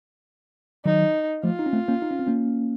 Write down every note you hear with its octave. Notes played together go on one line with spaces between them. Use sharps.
D#3 F#3 D#4
F3 A3 F4
D#4
C#4
A3 C4
A#3 C#4
D#4
C#4
C4
A#3 C#4